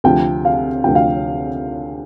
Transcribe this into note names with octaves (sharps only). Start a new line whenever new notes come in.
D2 C3 F3 G5
F5
D2 C3 F3 G5
F5